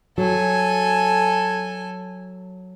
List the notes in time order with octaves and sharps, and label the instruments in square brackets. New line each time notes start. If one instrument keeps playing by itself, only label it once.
[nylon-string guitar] F#3 [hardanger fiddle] A4 G#5